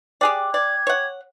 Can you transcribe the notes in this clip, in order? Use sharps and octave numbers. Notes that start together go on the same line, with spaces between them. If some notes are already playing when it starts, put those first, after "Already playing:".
G4 G#4 D5 G5 D6 F#6
D5 G#6
C#5 F#5